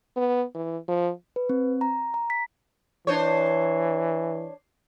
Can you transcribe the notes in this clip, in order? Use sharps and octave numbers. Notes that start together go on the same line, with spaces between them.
B3
E3
F3
B4
C4
A#5
A#5
B6
E3 D4 C5 C#5